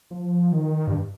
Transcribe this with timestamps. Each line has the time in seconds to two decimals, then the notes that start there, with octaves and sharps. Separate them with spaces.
0.11 F3
0.52 D#3
0.87 G2